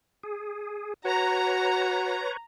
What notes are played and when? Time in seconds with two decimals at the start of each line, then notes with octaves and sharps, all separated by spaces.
0.23 G#4
1.05 F#4 B4 C#5 A#5